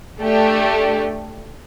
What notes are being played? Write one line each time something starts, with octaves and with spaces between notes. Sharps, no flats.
A3 D4 G4